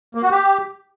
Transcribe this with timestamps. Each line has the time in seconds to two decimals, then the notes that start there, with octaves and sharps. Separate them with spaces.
0.15 A#3
0.23 F#4
0.31 G4